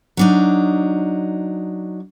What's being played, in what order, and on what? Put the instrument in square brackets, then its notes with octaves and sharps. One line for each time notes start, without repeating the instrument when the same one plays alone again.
[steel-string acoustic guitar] F#3 D4 D#4